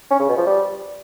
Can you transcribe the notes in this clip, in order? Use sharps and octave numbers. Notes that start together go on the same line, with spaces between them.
C#4
C#3
B2
F3
G3